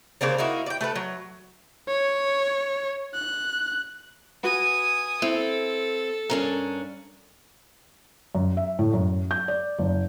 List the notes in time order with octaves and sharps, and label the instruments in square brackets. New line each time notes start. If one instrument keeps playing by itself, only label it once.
[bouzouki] C#3 A#3 C4 D4
A#3 D#4 E4 F#4
D5 G5
A3 A4 B4
F#3
[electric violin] C#5
F#6
[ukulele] F#4 B4 [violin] G#5 D#6
[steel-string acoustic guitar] C4 [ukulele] E4 [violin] A4
[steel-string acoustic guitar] G2 C#4 D4 [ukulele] A#4
[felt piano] F#2
E5
A2
F#2
G6
D5
F#1